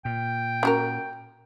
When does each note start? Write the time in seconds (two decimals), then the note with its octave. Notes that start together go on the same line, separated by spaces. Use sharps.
0.05 A#2 G5
0.63 C#4 F#4 A#4